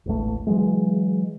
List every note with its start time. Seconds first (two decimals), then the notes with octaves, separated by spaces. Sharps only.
0.06 E1 A1 A3
0.47 C#3 E3 F#3 G#3